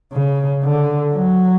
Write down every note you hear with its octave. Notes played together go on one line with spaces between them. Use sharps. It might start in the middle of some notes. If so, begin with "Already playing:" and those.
C#3
D3
F#3